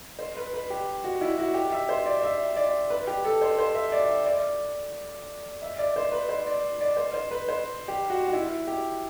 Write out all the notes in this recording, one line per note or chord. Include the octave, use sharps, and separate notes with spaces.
C5
B4
B4
G4
F#4
E4
F#4
G4
E5
C5
D5
E5
D5
B4
G4
A4
C5
C5
E5
D5
E5
D5
E5
D5
C5
B4
C5
D5
D5
C5
C5
B4
C5
G4
F#4
F#4
E4
G4